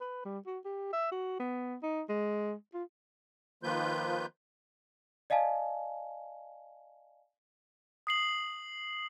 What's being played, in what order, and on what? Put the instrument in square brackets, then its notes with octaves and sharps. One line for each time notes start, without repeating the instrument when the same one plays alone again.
[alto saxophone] B4
G3
F#4
G4
E5
F#4
B3
D#4
G#3
F4
[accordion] D#3 F3 A#3 F4 B4 G6
[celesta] D5 D#5 F5 G#5 A5
[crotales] D#6 C7 F#7